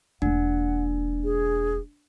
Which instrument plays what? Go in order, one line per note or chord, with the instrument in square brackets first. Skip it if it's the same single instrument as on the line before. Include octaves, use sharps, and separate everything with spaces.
[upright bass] E1 A#3 [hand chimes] D4 [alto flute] F#5
[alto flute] G#4